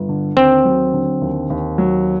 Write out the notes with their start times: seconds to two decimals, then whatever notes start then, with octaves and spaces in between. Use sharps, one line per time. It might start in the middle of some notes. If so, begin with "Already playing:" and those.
Already playing: G1
0.09 D3
0.37 D#2 C4
0.65 F#3
0.93 D3
1.21 D#2
1.50 D#2
1.78 F#3